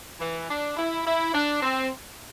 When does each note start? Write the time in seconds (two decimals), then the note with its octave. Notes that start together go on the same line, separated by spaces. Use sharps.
0.20 E3
0.49 D4
0.77 E4
1.06 E4
1.34 D4
1.63 C4